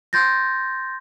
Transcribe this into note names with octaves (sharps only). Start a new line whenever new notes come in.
C6 G6 A6 A#6